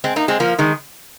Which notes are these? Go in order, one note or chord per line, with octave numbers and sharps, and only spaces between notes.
G#3 C4
A#3 D#4
G#3 C4
F3 A#3
D#3 G#3